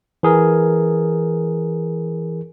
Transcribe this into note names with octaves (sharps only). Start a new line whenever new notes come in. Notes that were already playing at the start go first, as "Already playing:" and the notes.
E3 G#4 A#4